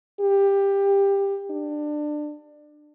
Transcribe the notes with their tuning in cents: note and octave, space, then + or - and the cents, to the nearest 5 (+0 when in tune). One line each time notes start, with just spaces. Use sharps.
G4 +15
D4 +25